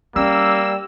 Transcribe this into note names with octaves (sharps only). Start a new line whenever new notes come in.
G3 A#3 C#4 E6